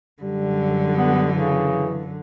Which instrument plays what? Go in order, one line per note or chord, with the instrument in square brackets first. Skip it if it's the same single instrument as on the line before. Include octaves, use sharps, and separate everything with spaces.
[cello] F#2 D3 [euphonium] G3
[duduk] B3
[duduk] C#3 [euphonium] E3